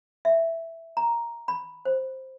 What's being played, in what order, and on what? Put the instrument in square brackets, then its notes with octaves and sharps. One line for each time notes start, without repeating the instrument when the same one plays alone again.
[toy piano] E5
A#5
B5
C5